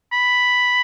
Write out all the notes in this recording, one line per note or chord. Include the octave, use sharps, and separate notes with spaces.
B5